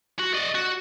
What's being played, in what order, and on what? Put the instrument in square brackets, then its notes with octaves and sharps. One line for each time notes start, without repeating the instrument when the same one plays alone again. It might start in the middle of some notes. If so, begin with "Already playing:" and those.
[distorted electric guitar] F#4
D5 D#5
F#4